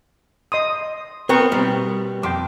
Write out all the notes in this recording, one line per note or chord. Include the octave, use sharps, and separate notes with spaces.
D#5 C6 D#6
B3 C4 A#4 G5 C#6
B2 G3
F2 G5 C6 D6